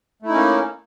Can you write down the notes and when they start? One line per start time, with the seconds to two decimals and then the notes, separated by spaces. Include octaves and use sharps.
0.22 A3
0.26 E4
0.29 D#4
0.32 C#4
0.35 A#3